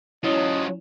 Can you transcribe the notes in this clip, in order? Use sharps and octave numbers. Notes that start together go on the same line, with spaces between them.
F#3 C#4 E4 F4 D#5